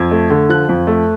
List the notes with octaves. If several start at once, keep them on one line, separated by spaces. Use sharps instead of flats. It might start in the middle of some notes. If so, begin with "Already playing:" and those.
Already playing: F2 G#6
A3
D3
F3 F#6
F2
A3